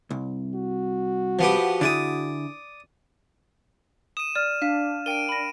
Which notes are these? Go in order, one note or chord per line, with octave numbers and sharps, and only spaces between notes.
C2
F#4
F3 B3 G4
D3 E4 G#4 D5 D#6
D#6 D#7 E7
D5 F6
D4 F5 B6
A#4 G5 D7 D#7
B5 A#6